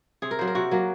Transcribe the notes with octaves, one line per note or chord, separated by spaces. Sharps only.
C3 G#4
A#4
F#3 A#3 C5
A#4
C3 F#4
F#3 A#3